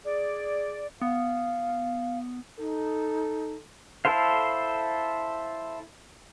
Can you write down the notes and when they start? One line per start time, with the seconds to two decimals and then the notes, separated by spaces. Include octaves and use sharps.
0.05 G#4 D5
1.01 B3 F5
2.59 D#4 A4
4.05 E4 A4 C5 F5